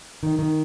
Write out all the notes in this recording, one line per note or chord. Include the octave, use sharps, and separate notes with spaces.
D#3
D#3